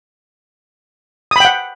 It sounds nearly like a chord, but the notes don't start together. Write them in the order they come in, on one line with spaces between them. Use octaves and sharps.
D#6 B5 G5 F#5